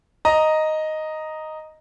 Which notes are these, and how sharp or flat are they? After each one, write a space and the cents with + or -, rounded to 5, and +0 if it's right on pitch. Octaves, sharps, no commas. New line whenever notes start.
D#5 +0 A#5 +0